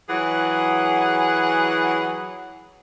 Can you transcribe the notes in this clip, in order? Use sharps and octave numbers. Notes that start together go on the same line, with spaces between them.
E3 F#3 G#4 F#5